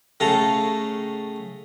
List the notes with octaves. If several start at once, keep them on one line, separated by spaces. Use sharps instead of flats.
A2 C#3 A4 A#5